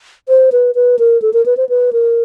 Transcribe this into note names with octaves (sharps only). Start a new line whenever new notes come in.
C5
B4
B4
A#4
A4
A#4
B4
C5
B4
A#4